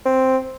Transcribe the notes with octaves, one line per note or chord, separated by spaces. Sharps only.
C4